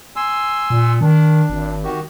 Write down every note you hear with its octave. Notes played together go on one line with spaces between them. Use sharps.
G#5 C6 E6
A#2
D#3 D4
G#1
D#3 F#4 G4